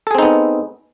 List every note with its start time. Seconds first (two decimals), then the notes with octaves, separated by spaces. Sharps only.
0.07 A4
0.11 G#4
0.15 C4
0.19 D#4
0.22 B3